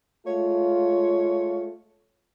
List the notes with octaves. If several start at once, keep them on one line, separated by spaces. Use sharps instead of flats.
G#3 A3 F4 C#5